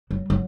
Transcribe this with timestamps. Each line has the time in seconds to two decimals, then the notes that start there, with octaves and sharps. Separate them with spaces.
0.11 F#3
0.30 F#3